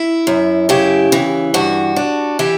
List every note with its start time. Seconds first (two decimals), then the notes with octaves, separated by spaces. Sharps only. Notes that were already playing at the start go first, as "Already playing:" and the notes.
Already playing: E4
0.27 F#2
0.69 C#3 E4 G4
1.12 E3
1.54 G2 F#4
1.96 D4
2.39 E3 E4 G4